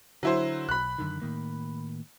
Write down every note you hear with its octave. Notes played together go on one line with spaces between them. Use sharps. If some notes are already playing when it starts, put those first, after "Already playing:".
D3 F#3 E4 C5
B1 B5 F#6
F#2 D3 D#3
A2 D#3 A#3